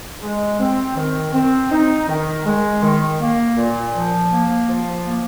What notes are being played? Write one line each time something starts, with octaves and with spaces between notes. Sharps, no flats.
G#3
C4
D#3
C4
D#4
D#3
G#3
D#3
A#3
A#2
F3
A#3
F3
A#3